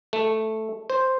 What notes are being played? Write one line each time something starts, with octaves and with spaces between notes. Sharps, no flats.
A3
C5